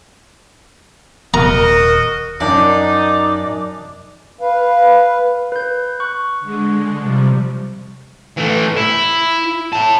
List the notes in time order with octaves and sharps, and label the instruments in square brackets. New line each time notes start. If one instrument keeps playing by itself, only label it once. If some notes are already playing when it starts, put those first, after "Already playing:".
[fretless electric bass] D#1 [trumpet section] F#4 D#5 [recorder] A#4 [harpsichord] A#5
[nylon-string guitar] F#2 [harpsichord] D4 [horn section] D#4 [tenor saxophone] D5
[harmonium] B4 F5
[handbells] B4 G6
C#6 F#6
[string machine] D3 G#3
C3 F3 G3
[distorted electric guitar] E3 A3
E4
E4 A5